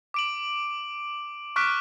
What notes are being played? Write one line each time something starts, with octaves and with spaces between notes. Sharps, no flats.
D6 D7 F#7
C#6 D6 F6 F#6 B6 D7